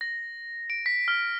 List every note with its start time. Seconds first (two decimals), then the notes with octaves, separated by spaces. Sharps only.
0.01 A#6
0.70 D7
0.86 B6
1.08 F6